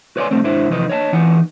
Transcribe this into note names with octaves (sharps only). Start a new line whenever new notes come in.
B4 C#5 D5 F#5 G#5 C6
C2 B2 A3 C4
G#2 D4 E4 C5
F2 C3 E3 D#4 B4 D#5
C#5 D#5 G#5 A5
E2 E3 D#4 F#5 G#5